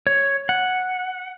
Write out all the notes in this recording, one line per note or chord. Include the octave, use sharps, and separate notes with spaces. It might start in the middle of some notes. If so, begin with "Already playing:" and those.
C#5
F#5